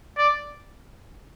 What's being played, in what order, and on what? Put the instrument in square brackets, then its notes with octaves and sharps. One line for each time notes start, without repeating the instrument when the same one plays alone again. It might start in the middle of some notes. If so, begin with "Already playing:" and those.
[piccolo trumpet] D5